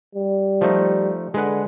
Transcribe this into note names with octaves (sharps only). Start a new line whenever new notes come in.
G3
F3 A3 D#4
D3 G#3 B4 F#5